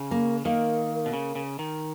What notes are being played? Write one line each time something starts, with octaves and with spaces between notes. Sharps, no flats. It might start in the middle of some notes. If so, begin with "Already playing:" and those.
Already playing: C#3
A#3
D#3 A#3
B2
C#3
C#3
D#3